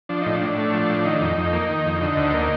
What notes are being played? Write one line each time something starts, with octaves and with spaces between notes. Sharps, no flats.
F3 D4
A2 D#4
D4
A2
A3
F3
A2
D#3 D#4
D4
F2 D#4
F2
A#3
D#3
F2
D3 D#4
D2
A#3